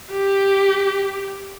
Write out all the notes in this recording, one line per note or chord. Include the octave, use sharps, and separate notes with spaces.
G4